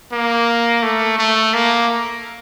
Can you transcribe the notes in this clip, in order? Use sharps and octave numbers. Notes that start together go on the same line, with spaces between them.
A#3
A3
A3
A#3